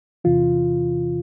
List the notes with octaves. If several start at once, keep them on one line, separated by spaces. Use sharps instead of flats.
E2 C3 E3 F4